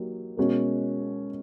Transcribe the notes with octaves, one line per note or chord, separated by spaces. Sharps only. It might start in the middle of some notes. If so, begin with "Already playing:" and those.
Already playing: F#3 A#3 D#4 G4
B2 G#3 C#4 F#4 A#4